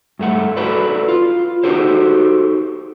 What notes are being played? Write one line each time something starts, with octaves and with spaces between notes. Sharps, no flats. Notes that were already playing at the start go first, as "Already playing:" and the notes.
G2 A3 F#5
F#4 A4 B4 D5
F4
D#4 F#4 G4 A4 C5